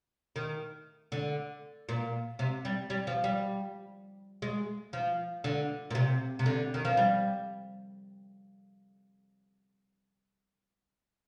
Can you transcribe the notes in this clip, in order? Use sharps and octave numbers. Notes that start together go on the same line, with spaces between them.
D#3
D3
A#2
C3
G3
G3
F3
G3
G#3
F3
D3
A#2
C3
C3
D3
D#3
F3
G3